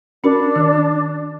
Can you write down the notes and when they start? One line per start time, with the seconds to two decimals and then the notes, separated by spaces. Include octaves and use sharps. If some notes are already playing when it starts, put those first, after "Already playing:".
0.24 C#4 D4 F#4 A#4
0.56 D#3